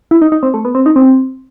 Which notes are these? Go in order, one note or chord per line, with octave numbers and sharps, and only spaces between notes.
E4
D#4
D#4
C4
A3
B3
C4
D#4
C4